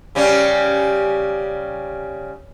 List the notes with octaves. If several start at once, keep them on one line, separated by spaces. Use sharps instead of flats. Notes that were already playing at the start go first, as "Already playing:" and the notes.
C#3 G3 C#4